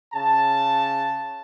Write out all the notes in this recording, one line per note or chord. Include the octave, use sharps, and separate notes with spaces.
C#3 A5